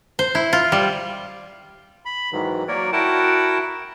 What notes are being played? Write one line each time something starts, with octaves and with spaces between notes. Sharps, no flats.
C5
E4
F4
G3
B5
G#2 D#3 E3 F#3
F#3 A#3 A#4 C#5 D5
E4 F#4 A#4 F#5 G5 A5